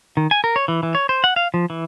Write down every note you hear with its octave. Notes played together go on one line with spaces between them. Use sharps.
D#3
G#5
A#4
C#5
E3
E3
C#5
C5
F#5
F5
F3
E3